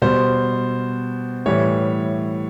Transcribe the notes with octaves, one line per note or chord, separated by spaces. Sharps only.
B2 G3 C5
A2 E3 G3 C#5